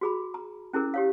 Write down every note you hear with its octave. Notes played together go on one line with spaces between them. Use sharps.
F#4 G#4 B5
A#5
C#4 E4 G#4 A#4
G4 C#5 F5